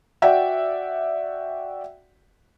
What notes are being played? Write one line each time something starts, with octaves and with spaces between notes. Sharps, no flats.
F#4 D5 E5 F#5 G5